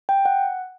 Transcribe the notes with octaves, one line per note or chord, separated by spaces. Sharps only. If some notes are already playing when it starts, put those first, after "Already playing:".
G5
F#5